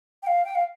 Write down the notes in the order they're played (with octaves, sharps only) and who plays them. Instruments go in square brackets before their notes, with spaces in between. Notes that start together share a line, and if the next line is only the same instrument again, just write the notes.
[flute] G5
F5
G5
F5